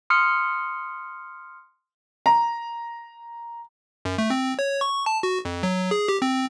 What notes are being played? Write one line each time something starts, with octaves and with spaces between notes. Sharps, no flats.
C6 D#6 F6 C#7
A#5
F#2
A3
C4
C#5
C#6
A5
F#4
F2
F#3
G#4
G4
C4